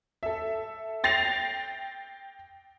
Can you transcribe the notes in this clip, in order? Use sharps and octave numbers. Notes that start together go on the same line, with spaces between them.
A4 E5
G5 A6 A#6 C7 F7